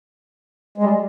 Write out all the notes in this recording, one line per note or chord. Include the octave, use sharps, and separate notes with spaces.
G#3
G3